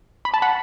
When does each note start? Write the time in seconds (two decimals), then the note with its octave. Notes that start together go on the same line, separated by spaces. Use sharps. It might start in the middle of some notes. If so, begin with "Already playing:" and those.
0.25 B5
0.34 A5
0.42 F#5 B5